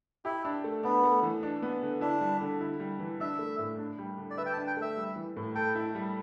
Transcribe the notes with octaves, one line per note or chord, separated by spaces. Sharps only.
E4 G4
D4
A3
B3 D4
A3
E3
D4
B3
D3
D4 E4
G3
D3
E4
G3
E3
D4 E5
A3
A2
D4
G3
D3
D5
B4 E5
G5
A5
D4
G5
A3 E5
G3
E3
A2
A4 G5
E4
G3